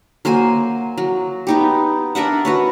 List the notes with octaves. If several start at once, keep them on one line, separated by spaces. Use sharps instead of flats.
F#3 A#3 C5 G#5
F#3
B3 D#4 G4
D4 A#4 E5 F#5
F#4 B4 C#5